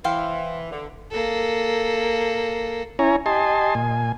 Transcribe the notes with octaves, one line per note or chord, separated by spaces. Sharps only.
E3 C5 F5 G5
D3
A#3 A4
C#4 E4 C#5 G#5 A#5
G4 D#5 G#5 A5 C6
A#2 G#5